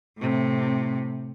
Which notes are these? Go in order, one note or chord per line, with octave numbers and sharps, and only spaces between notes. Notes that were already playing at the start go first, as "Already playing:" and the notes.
A2 C3